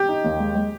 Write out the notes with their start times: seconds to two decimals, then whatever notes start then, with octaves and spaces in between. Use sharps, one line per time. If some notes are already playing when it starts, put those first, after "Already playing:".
Already playing: G4
0.09 D#4
0.24 D#2
0.40 G#3
0.55 G#3